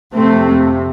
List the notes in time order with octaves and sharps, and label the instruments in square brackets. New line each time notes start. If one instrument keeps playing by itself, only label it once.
[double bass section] F2 C3 A3 C4